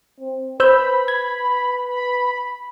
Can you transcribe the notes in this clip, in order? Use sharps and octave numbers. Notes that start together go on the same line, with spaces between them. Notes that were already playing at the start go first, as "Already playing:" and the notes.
C4
B4 C5 B5 E6 G6
G#6
B5